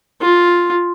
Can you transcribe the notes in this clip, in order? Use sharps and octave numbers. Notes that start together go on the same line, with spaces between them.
F4